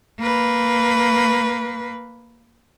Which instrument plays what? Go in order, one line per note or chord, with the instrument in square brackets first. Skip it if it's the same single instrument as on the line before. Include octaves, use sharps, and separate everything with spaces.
[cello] A#3 B4